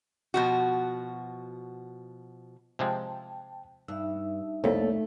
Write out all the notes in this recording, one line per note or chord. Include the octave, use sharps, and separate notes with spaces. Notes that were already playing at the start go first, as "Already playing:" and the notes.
B2 F3 F#4
C3 F3 G#3 G5 A5
G2 D#4 E5 E6
C2 F2 A3 A#3 A4 C#5